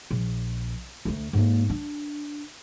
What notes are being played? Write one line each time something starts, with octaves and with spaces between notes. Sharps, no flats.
A#1
D2 A3
G#2 A#3
D4